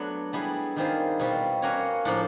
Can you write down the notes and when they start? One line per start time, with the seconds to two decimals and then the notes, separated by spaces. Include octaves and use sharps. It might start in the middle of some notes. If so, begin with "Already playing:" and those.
Already playing: F#3 A3 B3 D4
0.33 G3 B3 E4 G#4
0.76 D#3 G3 C4 F4 G#4
1.19 B2 G3 C4 F4
1.62 A#3 C#4 F#4 A#4 C#5
2.05 A2 F3 A#3 D4